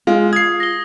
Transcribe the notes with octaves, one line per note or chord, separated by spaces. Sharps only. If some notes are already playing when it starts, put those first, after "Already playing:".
G#3 F4
D#6 G#6 C7
A#6 G7